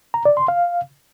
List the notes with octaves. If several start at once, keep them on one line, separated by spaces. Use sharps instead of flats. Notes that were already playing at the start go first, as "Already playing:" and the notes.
A#5
D5
C6
F5